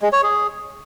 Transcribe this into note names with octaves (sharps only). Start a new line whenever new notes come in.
G#3
C#5
G#4